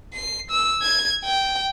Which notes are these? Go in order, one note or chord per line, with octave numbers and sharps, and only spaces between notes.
C7
E6
G#6
G5